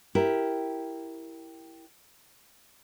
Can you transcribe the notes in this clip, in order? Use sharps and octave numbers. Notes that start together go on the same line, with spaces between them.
E4 G4 A#4